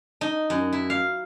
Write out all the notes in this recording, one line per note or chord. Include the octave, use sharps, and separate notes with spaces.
D#4
F#2
E4
F5